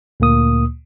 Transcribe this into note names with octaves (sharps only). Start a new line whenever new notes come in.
D2 A#2 A#3 D#6